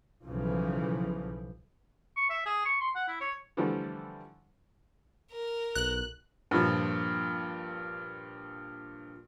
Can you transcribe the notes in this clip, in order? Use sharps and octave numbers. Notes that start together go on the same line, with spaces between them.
B1 C#3 E3 F3
C#6
E5
G#4
C#6
C6
F#5
E4
C#5
D3 E3 F3 G3 A3
A#4
B1 F#6
G2 A#2 F3